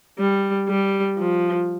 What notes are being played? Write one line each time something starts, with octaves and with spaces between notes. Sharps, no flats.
G3
G3
F3